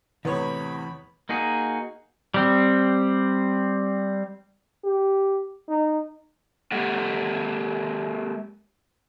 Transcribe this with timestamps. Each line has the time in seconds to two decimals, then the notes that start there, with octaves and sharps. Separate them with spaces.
0.25 E2 A2 C3 E3 B3 C#5 B5
1.29 A#3 D#4 F#4 G#4
2.34 G3 C4
4.84 G4
5.69 D#4
6.71 G#3 A#3 G4 A4 F#5